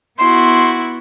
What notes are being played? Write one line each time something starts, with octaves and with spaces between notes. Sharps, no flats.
B3 E4 F#4 C6